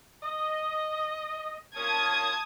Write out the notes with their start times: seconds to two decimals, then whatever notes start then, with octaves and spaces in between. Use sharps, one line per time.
0.23 D#5
1.76 A#3 C#4 F4 A5 D#6 G#6